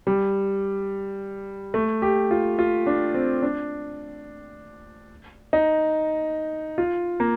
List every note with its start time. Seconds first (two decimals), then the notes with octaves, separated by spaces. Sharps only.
0.07 G3
1.74 A3
2.02 G4
2.31 F4
2.59 F4
2.86 D4
3.14 C4
3.42 D4
5.53 D#4
6.78 F4
7.20 A#3